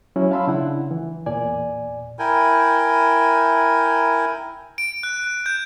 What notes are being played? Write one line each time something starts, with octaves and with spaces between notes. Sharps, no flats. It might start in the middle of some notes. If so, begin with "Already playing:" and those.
F#3 C#4 E4 F#4
F5 A5 B5 C6 E6
C#3 D4 E4 F#5
E3
E2 A#2 D5 G#5
E4 A#4 G5 G#5
D7
F#6
G6